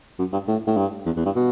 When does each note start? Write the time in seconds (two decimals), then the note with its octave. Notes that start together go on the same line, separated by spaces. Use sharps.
0.19 F#2
0.33 G2
0.48 A2
0.67 A2
0.77 G2
1.06 E2
1.16 E2
1.26 G2
1.36 B2